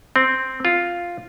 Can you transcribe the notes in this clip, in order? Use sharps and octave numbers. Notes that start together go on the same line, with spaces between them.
C4
F4